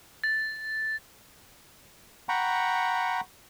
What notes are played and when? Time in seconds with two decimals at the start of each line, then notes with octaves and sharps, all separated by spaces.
0.24 A6
2.29 F#5 G5 A#5 B5 C#6